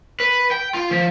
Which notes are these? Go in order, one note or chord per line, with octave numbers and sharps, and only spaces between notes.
B4
G5
F4
F3